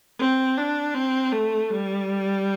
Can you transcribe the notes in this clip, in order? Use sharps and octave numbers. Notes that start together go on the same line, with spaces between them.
C4
D4
C4
A3
G3